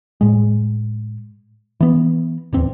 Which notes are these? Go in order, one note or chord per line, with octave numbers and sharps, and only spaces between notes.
A2 G#3
E3 B3
D1 E2 C4